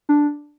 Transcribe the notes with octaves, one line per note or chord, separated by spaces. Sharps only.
D4